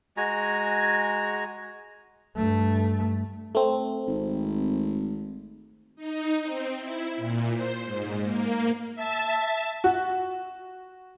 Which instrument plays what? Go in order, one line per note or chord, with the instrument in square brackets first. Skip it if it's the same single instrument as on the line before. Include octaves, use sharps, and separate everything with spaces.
[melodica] G#3 F#4 G#5 A#5
[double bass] G2 A3
[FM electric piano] A3 C4
[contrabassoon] G#1
[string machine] D#4
C4
E4
A#2
C5
G#2
A#3
E5 A5
[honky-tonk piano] F#4